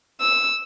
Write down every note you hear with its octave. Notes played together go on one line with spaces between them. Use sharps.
E6